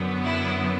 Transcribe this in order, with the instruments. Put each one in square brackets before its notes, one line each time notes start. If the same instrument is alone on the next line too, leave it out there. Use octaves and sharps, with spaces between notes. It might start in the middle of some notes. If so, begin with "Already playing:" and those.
Already playing: [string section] F#2 D3 F#3 B3
E4